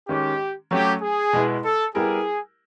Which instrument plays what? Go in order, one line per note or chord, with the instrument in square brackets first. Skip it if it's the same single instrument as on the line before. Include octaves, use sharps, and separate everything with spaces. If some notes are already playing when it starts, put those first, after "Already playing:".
[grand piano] D#3 G#3 C#4 [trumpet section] G4
[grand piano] F#3 A3 C#4 [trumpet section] G4
[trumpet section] G#4
[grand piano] B2 G#3 B3 E4
[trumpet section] A4
[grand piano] G3 B3 E4 G4 A#4 [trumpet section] G#4